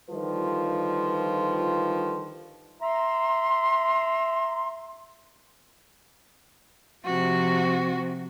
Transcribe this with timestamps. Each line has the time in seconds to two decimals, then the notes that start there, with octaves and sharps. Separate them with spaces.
0.10 D3 D#3 F3 G3 F4 B4
2.82 E5 A#5 C6
7.05 C3 F3 F#4